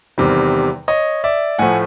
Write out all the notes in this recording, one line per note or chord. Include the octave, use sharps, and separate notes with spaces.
E2 C3 D#3 G3
C#5 D#5
D5 E5
A2 F3 A3 F#5 G#5